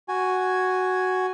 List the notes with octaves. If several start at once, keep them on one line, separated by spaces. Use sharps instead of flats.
F#4 G#5